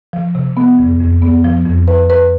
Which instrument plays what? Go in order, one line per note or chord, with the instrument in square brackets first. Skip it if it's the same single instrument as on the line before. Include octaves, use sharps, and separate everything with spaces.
[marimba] F3
C3
B3
F2
F2
B3
F3
F2
B4
B4